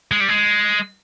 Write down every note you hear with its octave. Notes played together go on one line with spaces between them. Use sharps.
G#3
G3
G#3